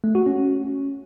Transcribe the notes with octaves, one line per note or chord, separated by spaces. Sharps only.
A3
F#4
C#4